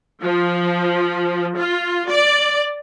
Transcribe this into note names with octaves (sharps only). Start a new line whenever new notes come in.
F3
F4
D5